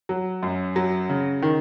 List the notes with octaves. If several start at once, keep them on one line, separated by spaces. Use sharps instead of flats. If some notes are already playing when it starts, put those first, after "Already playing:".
F#3
F#2
F#3
C#3
D#3